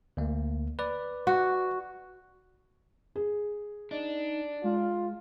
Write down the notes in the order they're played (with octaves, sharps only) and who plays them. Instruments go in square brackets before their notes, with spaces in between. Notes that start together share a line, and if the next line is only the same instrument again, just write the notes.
[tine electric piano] D2 A#3
B4 D5
[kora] F#4
[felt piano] G#4
[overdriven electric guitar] D4 [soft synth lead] D#4
[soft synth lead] G#3 [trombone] F4